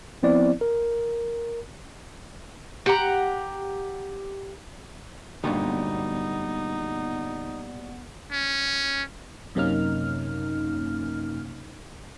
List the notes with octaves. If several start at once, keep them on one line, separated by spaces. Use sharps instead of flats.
F3 B3 C4 E4 D5
A#4
G4 F#5 A#5
G1 D2 A#2 F#3 G3 B3 D#4
C#4
F#2 C3 A#3 C#4 D#4 F6